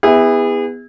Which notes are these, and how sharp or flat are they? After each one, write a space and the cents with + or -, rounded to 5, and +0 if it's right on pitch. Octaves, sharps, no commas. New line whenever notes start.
B3 +10 E4 -20 G#4 -35